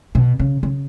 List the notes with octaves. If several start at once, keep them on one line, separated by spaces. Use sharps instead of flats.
B2
C#3
C#3